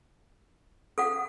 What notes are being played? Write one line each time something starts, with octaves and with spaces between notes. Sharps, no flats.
A4 F5 F#5 D#6